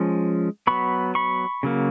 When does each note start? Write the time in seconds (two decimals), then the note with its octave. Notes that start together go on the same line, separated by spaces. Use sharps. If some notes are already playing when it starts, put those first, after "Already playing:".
Already playing: F3 G#3 C#4
0.67 F#3 B3 B5 C#6
1.15 B5 C#6
1.63 C#3 F#3 A#3